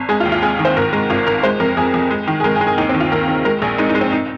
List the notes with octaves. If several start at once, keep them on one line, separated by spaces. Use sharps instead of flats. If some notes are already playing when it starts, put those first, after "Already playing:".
Already playing: G#1
G#3 G#4
F4
D#2
F4
G#3 G#4
D#3
C5
G#2 A#4
G#3
G#1 F4
G#1 A#4
G#3 C5
F2 A#4
F2 G#4
F2
G#3
D#3
G#4
G#3 A#4
G#4
G#3
G#4
D#2 D#4
C4
D#3
F4
D#2 A#4
D#3
G#3 A#4
A#1 G#4
G#3 D#4
D#4
G#3
C4
D#4